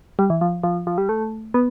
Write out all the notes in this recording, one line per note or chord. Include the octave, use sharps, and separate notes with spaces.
G3
E3
F3
F3
F3
G3
A3
B3